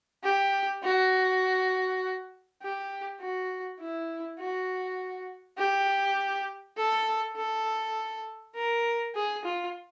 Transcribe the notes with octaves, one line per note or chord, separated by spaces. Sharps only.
G4
F#4
G4
F#4
E4
F#4
G4
A4
A4
A#4
G#4
F4